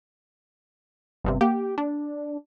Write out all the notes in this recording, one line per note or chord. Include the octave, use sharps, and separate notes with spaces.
G1 G2 C3
A#3 G4 F#5
D4